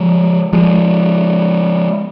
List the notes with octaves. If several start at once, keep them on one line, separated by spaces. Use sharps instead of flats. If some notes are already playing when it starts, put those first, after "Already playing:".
Already playing: F3 G#3
F3 G#3